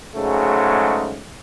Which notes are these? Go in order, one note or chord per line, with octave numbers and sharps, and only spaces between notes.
G#2 C#3 F#3 G#3 A3